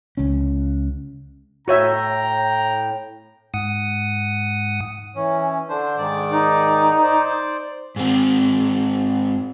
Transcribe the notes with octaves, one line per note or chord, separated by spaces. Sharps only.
C#2 C#4
A2 F#4 C#5 E5 G5 A#5
G#2 F#5 D#6
E3 C#4
D3 D4 C5
G#2 D#3 D5
D#4
C5 D5
G#2 C4